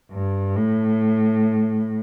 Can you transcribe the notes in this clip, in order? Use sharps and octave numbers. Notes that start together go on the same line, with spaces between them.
G2
A2